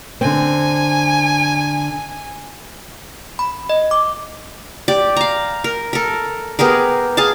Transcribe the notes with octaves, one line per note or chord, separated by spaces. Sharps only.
D3 C4 G#5
B5
D#5
D6
G4 D5
F5 A#5
A#4
A4 A#4
B3 G4 G#4 A#4
G#4 F5 A5